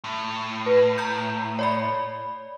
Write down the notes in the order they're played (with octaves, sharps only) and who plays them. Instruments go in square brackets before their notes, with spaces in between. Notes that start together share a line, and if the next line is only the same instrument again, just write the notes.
[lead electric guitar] A2
[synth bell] B4
A#5 G6
C#5 D5 B5